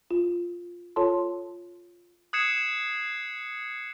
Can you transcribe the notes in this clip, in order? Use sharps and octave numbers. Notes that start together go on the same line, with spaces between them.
F4
F4 A4 C#5 A5 C6
D#6 F#6 G#6 C7 C#7 E7